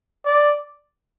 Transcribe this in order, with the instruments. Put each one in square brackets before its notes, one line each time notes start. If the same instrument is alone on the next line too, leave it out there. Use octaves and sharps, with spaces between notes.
[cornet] D5